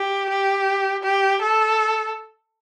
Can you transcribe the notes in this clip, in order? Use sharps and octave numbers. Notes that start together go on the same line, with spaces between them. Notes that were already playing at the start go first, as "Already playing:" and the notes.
Already playing: G4
G4
G4
A4